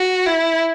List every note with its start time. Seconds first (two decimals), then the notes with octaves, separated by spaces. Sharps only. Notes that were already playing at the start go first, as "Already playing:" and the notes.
Already playing: F#4
0.26 E4